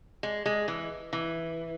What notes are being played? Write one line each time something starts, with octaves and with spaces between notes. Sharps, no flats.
G#3
G#3
E3
E3